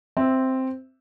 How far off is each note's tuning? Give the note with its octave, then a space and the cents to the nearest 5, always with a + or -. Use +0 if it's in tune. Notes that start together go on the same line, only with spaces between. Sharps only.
C4 +0 E5 +0